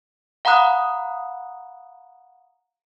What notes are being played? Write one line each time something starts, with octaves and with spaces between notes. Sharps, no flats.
F5 F#5 A#5 B5 D#6 F#6